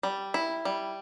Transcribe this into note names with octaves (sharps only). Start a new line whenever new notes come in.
G3
E4
G3